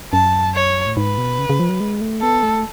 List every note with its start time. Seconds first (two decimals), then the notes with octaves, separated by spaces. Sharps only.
0.13 F#2 A5
0.55 C#5
0.87 A2
0.97 G#2 B4
1.18 B2
1.39 C#3
1.50 C#3
1.59 F3
1.69 F#3
1.80 G#3
2.01 A3
2.22 B3 A4
2.43 A3